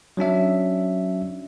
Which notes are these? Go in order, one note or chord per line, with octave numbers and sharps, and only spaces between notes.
F#3 C#4 D4 E5